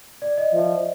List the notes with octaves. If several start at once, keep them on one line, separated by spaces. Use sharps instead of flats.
D5
D#5
F3 E5